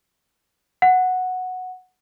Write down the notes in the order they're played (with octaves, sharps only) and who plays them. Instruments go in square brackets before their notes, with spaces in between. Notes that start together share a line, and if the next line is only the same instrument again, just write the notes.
[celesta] F#5